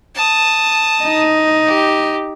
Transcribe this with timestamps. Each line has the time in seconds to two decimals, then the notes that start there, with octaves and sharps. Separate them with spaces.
0.15 A5 D#6
1.04 D#4
1.66 G4